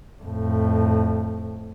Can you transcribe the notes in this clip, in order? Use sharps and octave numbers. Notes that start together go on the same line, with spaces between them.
F2 A2